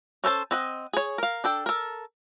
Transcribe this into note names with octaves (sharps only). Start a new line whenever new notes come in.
C#4 A4 C5 A5
C4 D#5 F#5
G#4 C#5
A#4 F5
D4 A4 G5
A4 A#4